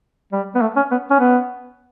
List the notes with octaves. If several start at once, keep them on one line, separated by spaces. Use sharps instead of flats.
G3
B3
A3
C#4
B3
C#4
B3